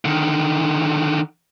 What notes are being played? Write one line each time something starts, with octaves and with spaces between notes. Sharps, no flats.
D3 D#3